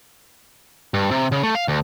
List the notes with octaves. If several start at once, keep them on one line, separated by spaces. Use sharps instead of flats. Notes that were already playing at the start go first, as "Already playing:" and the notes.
G2
C3
C#3
A3
F5
D2